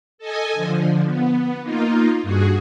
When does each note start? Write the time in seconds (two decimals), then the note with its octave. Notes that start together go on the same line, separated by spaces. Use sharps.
0.18 A4 D#5 G#5
0.53 D3 F3
1.05 B3
1.62 A#3 D#4 F4
2.22 G2 F#4 G#4